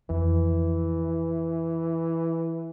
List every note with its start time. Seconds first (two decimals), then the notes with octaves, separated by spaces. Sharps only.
0.10 F2 E3